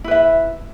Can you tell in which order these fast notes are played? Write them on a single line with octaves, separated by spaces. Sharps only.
E4 B4 E5